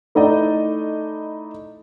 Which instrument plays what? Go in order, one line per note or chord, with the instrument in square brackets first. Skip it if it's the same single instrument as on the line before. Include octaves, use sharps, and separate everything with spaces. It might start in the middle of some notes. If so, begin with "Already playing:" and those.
[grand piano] A3 D#4 E4 A4 D5 D#5